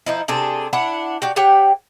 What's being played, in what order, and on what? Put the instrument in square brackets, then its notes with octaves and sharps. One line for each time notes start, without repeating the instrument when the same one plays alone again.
[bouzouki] F3 D#4 E4
C3 D4 G#4 A4
D4 E4 F#5
F#4 G4 D5
G4 C#5 F#5 G5